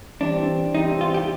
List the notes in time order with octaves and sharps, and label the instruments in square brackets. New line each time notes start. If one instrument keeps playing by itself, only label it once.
[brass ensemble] E3 G3 C4 [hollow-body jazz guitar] D4
[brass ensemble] E2 C3 E3 G3 C4 [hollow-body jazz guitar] D#4
[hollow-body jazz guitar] F4
G4